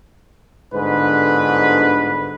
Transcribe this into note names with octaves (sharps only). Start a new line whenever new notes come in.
G1 G#2 D3 B4